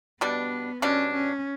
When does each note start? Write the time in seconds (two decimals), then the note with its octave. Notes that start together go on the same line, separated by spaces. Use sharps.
0.21 B2 G3 B3 D4
0.82 B2 G3 C#4 D4
1.12 C#4